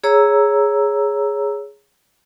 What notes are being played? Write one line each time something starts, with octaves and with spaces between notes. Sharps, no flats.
G#4 C#5 A#5 E6